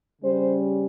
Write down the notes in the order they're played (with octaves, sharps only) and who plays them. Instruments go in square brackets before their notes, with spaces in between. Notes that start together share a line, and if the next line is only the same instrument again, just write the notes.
[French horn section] C#3 G3 C#4 C5